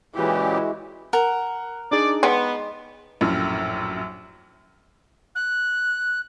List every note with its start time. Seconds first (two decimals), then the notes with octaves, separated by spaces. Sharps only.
0.15 A#2 C#3 E3 G#3 E4 F#4 G4
1.13 A#4 F#5
1.91 D4 D#4 G#4 D5
2.23 G#3 B3 D#4 G5 C6
3.21 A#1 F#2 A2
5.35 F#6